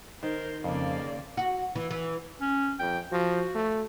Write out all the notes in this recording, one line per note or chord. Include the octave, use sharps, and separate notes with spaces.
D#3 A#4 C5
F2 C#3 A#3 C4 D5
F#4
E3
E3
C#4
F2 G5
F3 F#4
A3